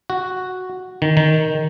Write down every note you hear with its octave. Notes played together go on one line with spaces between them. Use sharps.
F#4
D#3
D#3